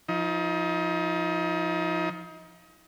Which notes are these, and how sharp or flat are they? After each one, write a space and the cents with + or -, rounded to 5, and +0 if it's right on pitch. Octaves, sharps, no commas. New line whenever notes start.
F3 +0 D#4 +35